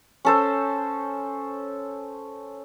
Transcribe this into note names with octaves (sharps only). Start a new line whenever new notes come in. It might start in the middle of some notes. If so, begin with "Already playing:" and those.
C#4 A4 C5